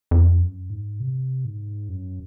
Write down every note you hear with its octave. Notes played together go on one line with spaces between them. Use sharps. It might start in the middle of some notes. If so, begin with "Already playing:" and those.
F2
F#2
G#2
C3
G#2
F#2